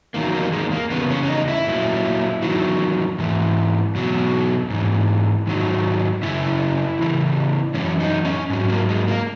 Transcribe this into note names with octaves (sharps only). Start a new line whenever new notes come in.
E2 D#3 F#3 A#3
A#3
G#3
A#3
E2 C#3 B3
C#4
C#4
D#4
E4
A#2 F#3
E2 D#3 F#3
G#2 E3
E2 B2 F#3
G#2 E3
G#2 D#3 F#3
F#2 C#3 E4
E2 C#3 E3
F#2 E3 C#4
D#4
C#4
G#2 F#3
A#3
G#3
A#3